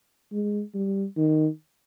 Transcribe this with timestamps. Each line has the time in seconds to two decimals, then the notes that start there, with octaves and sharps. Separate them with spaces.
0.32 G#3
0.74 G3
1.17 D#3